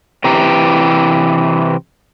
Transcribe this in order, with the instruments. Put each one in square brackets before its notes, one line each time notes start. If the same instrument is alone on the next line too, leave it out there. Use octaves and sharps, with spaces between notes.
[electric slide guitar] C3 E3 G4 A#5